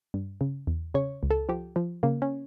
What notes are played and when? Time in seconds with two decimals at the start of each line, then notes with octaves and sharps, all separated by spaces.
0.14 G2
0.41 C#3
0.67 E2
0.94 C#3 C#5
1.23 C#2
1.31 A4
1.49 F3 G4
1.76 F3
2.03 C#3 A#3
2.22 C#4